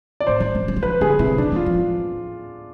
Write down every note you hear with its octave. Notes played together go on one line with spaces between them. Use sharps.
D5
A2 C5
E3
E3
F3
G#3
F3 B4
D3 G#4
C3 E4
D3 D4
E3 F4
F3